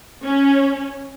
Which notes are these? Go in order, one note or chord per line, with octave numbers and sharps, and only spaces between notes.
C#4